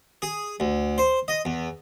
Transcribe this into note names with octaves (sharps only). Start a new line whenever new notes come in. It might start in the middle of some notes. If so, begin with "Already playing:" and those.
G#4
D2
C5
D#5
E2